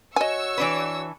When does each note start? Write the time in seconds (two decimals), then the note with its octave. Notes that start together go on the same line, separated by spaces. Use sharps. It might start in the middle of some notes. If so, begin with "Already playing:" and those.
0.16 F#4 C#5 D#5 G#5 C#6 E6
0.58 E3 D4 B4